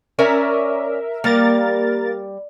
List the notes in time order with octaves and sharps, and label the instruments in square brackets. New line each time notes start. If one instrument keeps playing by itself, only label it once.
[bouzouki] C#4 D5 G#5 [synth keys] A#4 E5
[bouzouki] G3 [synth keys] A#3 A#4 A6